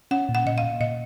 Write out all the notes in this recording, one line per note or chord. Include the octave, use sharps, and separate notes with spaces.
C#4 F#5
A#2
F#5
A#2 D#5
F5
A#2
A#2 D#5